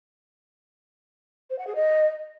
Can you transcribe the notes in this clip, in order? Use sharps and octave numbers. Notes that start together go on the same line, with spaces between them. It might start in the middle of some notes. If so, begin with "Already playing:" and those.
C5
F#5
G#4
D#5